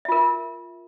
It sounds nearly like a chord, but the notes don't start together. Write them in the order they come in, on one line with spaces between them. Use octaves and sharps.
E5 F4 A#4